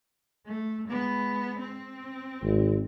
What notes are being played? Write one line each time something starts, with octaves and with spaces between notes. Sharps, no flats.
A3
G#3 B3
C4
G#1